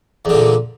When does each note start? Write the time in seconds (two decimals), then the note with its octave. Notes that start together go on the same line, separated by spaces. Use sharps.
0.25 E2
0.29 D3
0.34 A#2